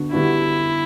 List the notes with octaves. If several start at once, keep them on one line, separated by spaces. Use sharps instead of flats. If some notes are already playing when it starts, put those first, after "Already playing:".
Already playing: D3 B3 D4 F#4
D3 G3 B3 D4 E4 F#4